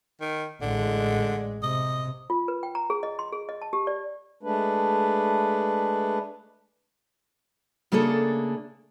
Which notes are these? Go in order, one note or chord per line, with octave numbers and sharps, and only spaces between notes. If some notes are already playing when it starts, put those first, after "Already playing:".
D#3
A1 D3 G#3
C3 D#5
F4
B4
G5
A#5
G#4
D#5
C6
G#4
D#5
A5
G4
D5
G#3 A3 D4 B4
C#3 A3 A#3 D4 G#4 A4